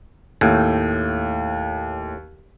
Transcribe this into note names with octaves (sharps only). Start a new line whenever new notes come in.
D#2 A2